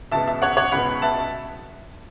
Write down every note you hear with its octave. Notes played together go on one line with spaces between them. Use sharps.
C#2 B2 B3 E5 A5
E5
C#5 F#5
C#5 F#5
C#2 B2 B3 F#5 B5
E5 A5